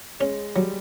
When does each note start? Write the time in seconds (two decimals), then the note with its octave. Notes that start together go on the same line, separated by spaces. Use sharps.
0.20 G#3 C#4
0.56 F#3 G3